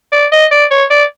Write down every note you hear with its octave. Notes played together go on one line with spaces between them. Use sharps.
D5
D#5
D5
C#5
D5